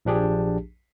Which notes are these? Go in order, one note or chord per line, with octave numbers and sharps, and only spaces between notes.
A#1 F3 D4 G4 G#4